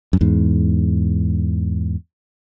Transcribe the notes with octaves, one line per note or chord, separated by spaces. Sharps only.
F#2
E2 G#2